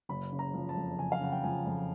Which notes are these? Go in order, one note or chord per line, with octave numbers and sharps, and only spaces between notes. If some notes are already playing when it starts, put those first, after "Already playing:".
F#1 B5
C#3
A#5
F3
A5
F2
F#1 G#5
F5
C#3 F#5
G5
F3 G#5
F2